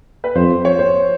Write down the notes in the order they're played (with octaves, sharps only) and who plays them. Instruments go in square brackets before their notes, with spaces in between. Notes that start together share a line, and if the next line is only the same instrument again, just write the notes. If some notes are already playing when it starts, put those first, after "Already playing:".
[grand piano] B4
[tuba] F2 [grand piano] C5
[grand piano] C#5
C5